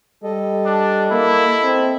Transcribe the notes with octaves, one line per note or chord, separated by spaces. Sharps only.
G3 A4 D#5
D4
A#3 E4
C4